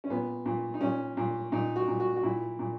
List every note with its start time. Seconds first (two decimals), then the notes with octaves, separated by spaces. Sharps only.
0.04 C#4
0.10 A#2 B3
0.46 A#2
0.74 D#4
0.81 A#2 C#4
1.17 A#2
1.52 A#2 D#4
1.76 F#4
1.88 A#2
2.00 F#4
2.16 F#4
2.23 A#2 E4
2.59 A#2